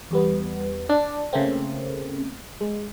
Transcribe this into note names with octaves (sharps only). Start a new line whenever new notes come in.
E2 G3 B3
D4
C#3 A3 A#3 C4
G#3